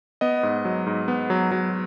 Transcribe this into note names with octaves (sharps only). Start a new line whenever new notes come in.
B3 D#5
G#2
F#3
G#2
B3
F#3
F#3